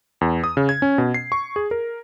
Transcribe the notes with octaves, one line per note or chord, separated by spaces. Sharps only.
E2
D#6
C#3
G#6
C#4
B2
C7
C#6
G#4
A#4